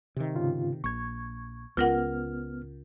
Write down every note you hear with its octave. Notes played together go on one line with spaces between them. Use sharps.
C3 D#3
G#2 C#3 F4
A#1 C#6 G#6
C#2 B3 F4 A#4 F#5 F6